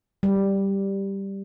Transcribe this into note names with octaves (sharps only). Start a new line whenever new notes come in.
G3